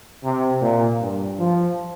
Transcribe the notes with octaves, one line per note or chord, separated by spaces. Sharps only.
C3
A#2
G2
F3